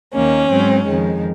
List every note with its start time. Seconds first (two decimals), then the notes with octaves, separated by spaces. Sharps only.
0.14 D#2 D#3 A#3 C#4
0.49 G#2 F#3 C4
0.86 F2 D#3 G#3